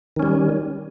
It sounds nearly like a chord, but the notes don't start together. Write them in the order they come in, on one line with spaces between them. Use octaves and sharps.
D#3 C#4 G3